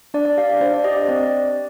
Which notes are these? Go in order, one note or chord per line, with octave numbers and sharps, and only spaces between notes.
D4 D5
D5
G4 F5
D5
D4 C5
D5
G4 D#5
D#5
C4 D5